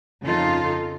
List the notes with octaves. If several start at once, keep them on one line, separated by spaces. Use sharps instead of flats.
F2 C#3 D#4 F4 A4